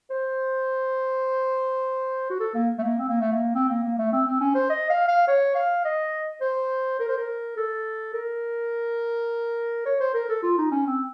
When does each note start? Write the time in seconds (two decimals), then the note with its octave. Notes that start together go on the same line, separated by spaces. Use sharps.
0.10 C5
2.30 F#4
2.40 A4
2.54 A#3
2.79 A3
2.83 A#3
2.98 C4
3.09 A#3
3.21 A3
3.32 A#3
3.55 C4
3.69 A#3
3.84 A#3
3.99 A3
4.13 C4
4.27 C4
4.41 C#4
4.55 C5
4.70 D#5
4.90 F5
5.08 F5
5.28 C#5
5.55 F5
5.85 D#5
6.41 C5
7.00 A#4
7.09 C5
7.17 A#4
7.57 A4
8.14 A#4
9.86 C#5
10.00 C5
10.14 A#4
10.29 A4
10.43 F4
10.58 D#4
10.72 C#4
10.87 C4